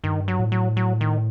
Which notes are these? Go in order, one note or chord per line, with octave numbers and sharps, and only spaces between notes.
G2 D#3
F#3
A2
F#3
F#3
D#3